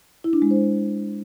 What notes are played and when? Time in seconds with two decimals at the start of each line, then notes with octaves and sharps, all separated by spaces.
0.24 E4
0.33 D4
0.42 G#3
0.51 C5